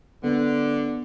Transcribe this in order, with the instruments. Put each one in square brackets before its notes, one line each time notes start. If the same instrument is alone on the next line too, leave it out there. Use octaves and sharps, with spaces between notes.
[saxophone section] D3 [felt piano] B3